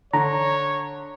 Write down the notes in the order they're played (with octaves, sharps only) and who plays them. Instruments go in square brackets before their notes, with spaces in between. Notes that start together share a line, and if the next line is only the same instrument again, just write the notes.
[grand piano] D3 [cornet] C#5 [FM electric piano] A#5